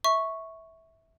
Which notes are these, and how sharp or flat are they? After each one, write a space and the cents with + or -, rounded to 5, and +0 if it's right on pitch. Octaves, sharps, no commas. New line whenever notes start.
E5 -15 C#6 +0